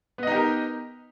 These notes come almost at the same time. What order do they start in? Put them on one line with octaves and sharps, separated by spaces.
B3 D#5 D#4 G4 A#4